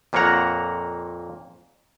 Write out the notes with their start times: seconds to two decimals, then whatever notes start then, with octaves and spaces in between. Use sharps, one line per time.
0.13 F2 A#2 A#3 C#5 F#5 A#5